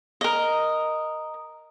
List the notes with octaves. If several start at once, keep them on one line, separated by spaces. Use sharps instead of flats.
A#4 D#5